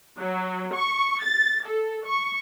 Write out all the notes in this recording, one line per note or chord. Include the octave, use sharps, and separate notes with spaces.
F#3
C#6
A6
A4
C#6